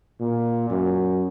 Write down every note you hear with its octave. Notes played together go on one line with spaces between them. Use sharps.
A#2
F#2